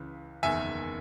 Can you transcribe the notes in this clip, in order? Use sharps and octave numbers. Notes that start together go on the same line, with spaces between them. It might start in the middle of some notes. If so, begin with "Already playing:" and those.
Already playing: C#2 C#3 E3
F#1 E2 D#3 E5 G#5